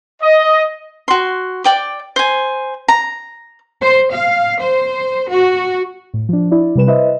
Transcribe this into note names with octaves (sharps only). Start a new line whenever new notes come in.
D#5
F#4 C6
D5 G5 D6
C5 G#5
A#5
C5
F5
C5
F#4
A2
F3 D4
E4 D5
C3 G3 B4 E7
E4 B4 C5 D#5 E5